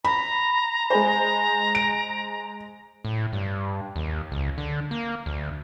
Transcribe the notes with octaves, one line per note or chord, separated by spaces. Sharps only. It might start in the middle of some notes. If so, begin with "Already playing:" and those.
A#5 B5
G#3 G#4 C5
D7
A2
G2
D#2
C#2
D3
A#3
D2